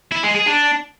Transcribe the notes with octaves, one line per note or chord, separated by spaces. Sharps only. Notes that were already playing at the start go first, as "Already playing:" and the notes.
E4
G#3
G#4
D4